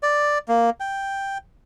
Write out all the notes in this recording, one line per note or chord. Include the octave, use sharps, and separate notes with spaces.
D5
A#3
G5